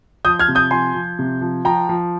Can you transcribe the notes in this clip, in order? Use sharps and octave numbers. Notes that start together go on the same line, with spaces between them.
F3 D#6 G6
F6 G#6
C3
D#6 G6
F3 G#5 C6
F3
C3
F3
F3 G5 A#5
F3